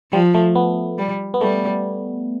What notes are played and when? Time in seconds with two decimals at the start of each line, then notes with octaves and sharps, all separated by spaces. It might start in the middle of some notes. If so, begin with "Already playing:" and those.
0.12 F3 G3
0.34 A3
0.55 B3
0.98 G3
1.34 B3
1.41 G3 A3